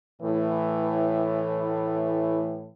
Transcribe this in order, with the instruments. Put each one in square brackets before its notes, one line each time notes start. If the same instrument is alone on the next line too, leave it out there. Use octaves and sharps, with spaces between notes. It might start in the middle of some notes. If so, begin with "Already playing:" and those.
[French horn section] A2 E3